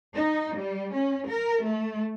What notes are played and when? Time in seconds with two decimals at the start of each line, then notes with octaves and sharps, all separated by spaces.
0.13 D#4
0.55 G3
0.93 C#4
1.26 A#4
1.63 A3